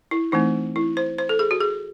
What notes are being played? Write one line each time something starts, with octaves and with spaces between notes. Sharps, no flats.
E4
E3 A3 C4 D#4
E4
C5
C5
A4
G#4
F#4
G#4